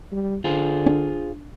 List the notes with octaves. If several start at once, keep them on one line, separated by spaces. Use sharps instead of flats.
G3
D3 F4 G#4 C5
C#4 D4